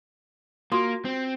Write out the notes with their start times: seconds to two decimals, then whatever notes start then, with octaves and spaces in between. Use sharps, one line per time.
0.72 A#3 F4 F#4 C6
1.05 C4